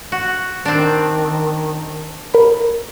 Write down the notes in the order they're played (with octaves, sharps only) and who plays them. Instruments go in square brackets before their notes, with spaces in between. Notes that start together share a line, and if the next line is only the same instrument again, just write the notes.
[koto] F#4
[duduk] D#3 [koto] C4 D4
[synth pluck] A#4 B5